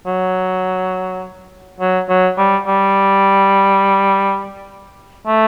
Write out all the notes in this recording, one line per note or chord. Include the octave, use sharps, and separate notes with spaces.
F#3
F#3
F#3
G3
G3
A3